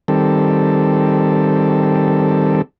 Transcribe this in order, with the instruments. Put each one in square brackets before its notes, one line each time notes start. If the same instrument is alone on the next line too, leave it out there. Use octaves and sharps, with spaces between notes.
[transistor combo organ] D#3 G3 C4 A4